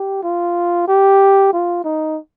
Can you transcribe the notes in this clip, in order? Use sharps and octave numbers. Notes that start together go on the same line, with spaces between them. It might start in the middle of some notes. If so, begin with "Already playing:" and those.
Already playing: G4
F4
G4
F4
D#4